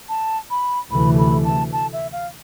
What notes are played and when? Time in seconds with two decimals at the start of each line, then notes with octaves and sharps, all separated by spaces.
0.09 A5
0.51 B5
0.91 D2 C3 E3 A3 B5
1.18 B5
1.45 A5
1.73 A5
1.93 E5
2.13 F5